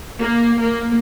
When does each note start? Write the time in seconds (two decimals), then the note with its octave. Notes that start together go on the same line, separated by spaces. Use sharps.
0.20 A#3
0.61 A#3